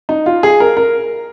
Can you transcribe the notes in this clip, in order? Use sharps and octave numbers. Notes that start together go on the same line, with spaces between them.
D#4
F4
G#4
A#4
A#4